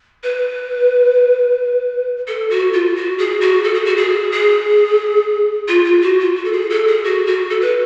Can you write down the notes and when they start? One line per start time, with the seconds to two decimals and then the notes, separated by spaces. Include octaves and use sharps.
0.23 B4
2.28 A4
2.50 F#4
2.73 F4
2.96 F#4
3.18 G#4
3.41 F#4
3.64 A4
3.74 G#4
3.85 F#4
3.97 G#4
4.32 G#4
5.68 F4
5.85 F4
6.02 F#4
6.20 F4
6.36 F#4
6.45 A4
6.53 G#4
6.70 A4
6.88 G#4
7.04 F#4
7.27 F#4
7.50 A4
7.61 B4